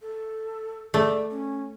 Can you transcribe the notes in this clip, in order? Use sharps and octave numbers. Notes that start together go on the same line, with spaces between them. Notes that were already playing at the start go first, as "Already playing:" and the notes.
A4
A3 D5
C#4